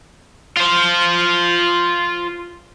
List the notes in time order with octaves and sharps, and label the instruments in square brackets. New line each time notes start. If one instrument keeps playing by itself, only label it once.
[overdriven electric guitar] F4 C5